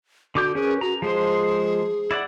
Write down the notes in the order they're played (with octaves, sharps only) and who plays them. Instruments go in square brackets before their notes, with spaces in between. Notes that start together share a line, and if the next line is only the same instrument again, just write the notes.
[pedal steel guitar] D3 D6 G6 [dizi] F#4
[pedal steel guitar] C#4 A#4 B4 [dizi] G#4
[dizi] F#4 [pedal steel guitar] A#5
[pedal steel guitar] F3 G#3 C5 [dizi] G#4
[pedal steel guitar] E4 D5 F#5